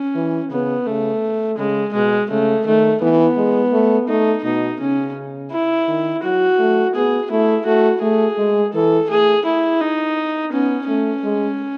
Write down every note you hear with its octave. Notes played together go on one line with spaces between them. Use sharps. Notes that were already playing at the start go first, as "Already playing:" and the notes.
Already playing: C#4
E3
C#3 B3
C#3 A3
C#3 G#3
B2 G#3
C#3 A3
D#3 A3
E3 B3
G#3
A3
A3 D#4
B2 D#4
C#3 C#4
E4
D#3
F#3 F#4
A3
B3 G#4
A3 E4
A3 F#4
A3 G#4
G#3
E3 A4
A3 G#4
E4
D#4
B3 C#4
A3 C#4
G#3